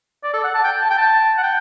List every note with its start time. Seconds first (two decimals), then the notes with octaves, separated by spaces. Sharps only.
0.24 D5
0.33 A4
0.44 F#5
0.54 A5
0.64 G5
0.82 A5
0.90 G5
0.98 A5
1.38 F#5
1.43 G5